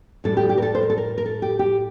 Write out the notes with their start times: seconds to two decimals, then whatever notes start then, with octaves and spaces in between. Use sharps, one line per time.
0.24 A2 G3 D4 A4
0.37 G4
0.49 G4
0.58 A#4
0.62 A4
0.75 C5
0.83 A#4
0.90 A4
0.98 A#4
1.18 A#4
1.26 A4
1.42 G4
1.59 G4